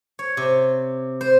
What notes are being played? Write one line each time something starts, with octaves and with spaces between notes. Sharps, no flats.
C#5
C3
C5